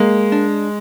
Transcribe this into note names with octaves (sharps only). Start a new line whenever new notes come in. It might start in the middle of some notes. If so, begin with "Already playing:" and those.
Already playing: G#3 A#3
D4